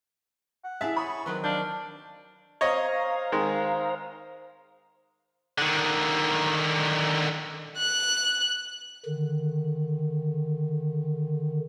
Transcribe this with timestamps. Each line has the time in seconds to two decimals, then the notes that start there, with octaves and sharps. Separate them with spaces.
0.64 F#5
0.81 E4 G#4 E5 A5
0.96 C#5 B5 D#6
1.26 D#3 F#3 C4 B4
1.44 D4 F5 G6
2.61 C5 C#5 D#5 F5 A#5
3.32 D#3 G#3
5.58 D3 D#3
7.78 F#6
9.06 D3 D#3